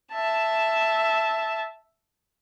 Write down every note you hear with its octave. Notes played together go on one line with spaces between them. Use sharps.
E5 A5